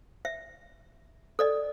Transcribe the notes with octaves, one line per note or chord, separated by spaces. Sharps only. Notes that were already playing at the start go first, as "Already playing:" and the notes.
E5
A4 D5 D#5